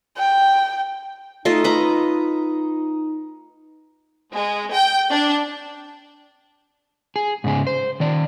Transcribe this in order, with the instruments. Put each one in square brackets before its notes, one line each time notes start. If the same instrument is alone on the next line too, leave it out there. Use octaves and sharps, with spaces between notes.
[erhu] G5
[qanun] A3 F4 D#5 [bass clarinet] D#4
[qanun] B4 D#5 A#5
[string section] G#3
G5
D4
[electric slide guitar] G#4
G#2 C#3 G#4
C5
D#3 D5